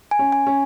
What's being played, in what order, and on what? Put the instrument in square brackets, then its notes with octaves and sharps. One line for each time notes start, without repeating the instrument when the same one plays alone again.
[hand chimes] G#5
[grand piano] C#4
[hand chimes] G#5
[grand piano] C#4